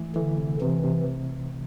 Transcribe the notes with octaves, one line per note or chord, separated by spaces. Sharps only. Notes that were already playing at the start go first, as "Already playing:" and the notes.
Already playing: E3 A3
D3 E3
C3
C3 E3
C3